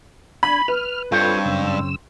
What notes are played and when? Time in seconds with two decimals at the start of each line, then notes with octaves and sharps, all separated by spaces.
0.43 D4 G#5 B5
0.68 B4 F6
1.12 G2 C4 F4 A4 C5 C#5
1.45 F#2 C#3 E6